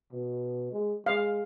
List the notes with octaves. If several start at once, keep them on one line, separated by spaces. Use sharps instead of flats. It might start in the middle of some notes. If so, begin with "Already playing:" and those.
B2
G#3
G#3 F5